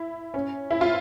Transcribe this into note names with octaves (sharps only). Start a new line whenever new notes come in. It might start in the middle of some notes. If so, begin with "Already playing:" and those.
Already playing: E4
C#4
E4
F4